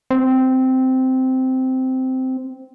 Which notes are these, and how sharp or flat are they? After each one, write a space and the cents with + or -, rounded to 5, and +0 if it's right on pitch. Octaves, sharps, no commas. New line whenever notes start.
C4 -10